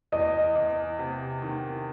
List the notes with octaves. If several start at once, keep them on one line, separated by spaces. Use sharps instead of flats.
E2 D#5
E2
C3
D#3